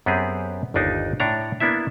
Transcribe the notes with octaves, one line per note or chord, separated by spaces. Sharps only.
F#2 B3 C4 G4 G#4
G1 D#2 D4 D#4 C5
A2 D4 C#5 A#5
A#3 B3 D4 E4 E5